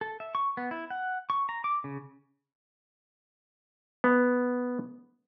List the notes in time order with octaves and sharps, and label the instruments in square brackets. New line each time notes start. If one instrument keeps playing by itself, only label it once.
[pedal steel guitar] A4
E5
C#6
B3
E4
F#5
C#6
A#5
D6
C#3
[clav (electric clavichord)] B3